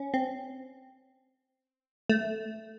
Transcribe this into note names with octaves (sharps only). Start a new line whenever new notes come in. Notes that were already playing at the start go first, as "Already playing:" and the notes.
Already playing: C#4
C4
A3